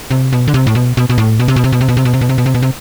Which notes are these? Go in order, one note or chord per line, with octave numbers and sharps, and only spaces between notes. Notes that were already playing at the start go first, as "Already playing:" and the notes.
C3
B2
D3
C3
A2
B2
B2
B2
A2
B2
C3
B2
C3
B2
C3
B2
C3
B2
C3
B2
C3
B2
C3
B2
C3